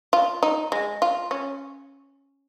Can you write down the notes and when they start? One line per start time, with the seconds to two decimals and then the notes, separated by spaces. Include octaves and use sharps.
0.13 F4
0.43 D#4
0.72 G#3
1.02 F4
1.31 C#4